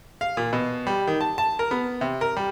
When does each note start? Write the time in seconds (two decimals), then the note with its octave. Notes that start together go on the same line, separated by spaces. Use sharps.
0.21 F5
0.37 A#2
0.53 B2
0.87 G3
1.07 D#3
1.21 A5
1.38 A5
1.59 A#4
1.71 B3
2.01 C3
2.21 A#4
2.37 G3